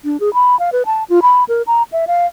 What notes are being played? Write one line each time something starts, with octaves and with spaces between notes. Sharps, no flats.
D4
G#4
B5
F5
B4
A5
F4
B5
A#4
A#5
E5
F5